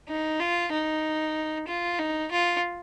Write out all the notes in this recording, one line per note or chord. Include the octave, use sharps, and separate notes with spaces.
D#4
F4
D#4
F4
D#4
F4